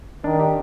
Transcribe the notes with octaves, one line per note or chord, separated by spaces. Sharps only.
D#3 D4
G4